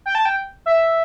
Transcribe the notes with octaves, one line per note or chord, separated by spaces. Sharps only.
G5
A5
G5
E5